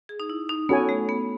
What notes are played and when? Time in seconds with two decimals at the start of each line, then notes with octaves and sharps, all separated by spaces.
0.09 G#4
0.20 D#4
0.30 E4
0.49 D#4
0.69 B3 C#4 F#4 A4 C#5 G#5
0.89 A3
1.09 B3